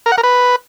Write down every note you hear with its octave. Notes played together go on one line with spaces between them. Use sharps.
A#4
F#5
A#4
B4